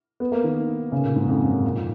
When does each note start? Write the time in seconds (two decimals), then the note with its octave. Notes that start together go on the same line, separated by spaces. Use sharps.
0.20 B3
0.32 A#3
0.44 D#3
0.92 C#3
1.05 A#2
1.16 G#2
1.28 F2
1.40 F#2
1.52 C#3
1.64 A#2
1.76 F3